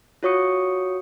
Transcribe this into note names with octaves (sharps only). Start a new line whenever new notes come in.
F4 F#4 C#5 C#6 D#6 C#7